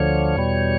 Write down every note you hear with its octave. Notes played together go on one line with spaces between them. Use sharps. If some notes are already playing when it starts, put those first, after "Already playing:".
Already playing: D2 D3 F3 C#5
E2 B2 G3